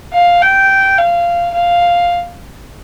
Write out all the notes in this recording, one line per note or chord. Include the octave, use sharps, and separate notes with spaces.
F5
G5
F5
F5